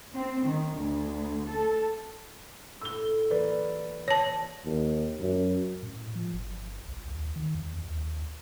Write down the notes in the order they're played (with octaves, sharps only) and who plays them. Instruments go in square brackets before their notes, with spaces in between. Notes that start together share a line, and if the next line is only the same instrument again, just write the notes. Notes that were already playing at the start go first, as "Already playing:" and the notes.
[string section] C4
D#3
D2
A4
[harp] A2 [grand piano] E6 G7
[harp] E3 A#3 [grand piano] B4 D5
[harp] G4
[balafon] C#5 A5
[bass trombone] D#2
F#2
[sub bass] A2
F3
G1
C2
D#2
D#3
E2
D#2